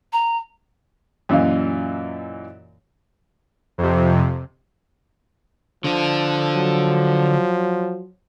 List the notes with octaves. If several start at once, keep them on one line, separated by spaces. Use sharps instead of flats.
A#5
F#2 A#2 E3 D#5 F5
F2 C3
D3 F3 D4
F#3